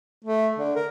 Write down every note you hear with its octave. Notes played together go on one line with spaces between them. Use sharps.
A3
D3
A#4